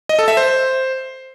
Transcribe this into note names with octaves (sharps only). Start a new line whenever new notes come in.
D#5
A4
E5
C5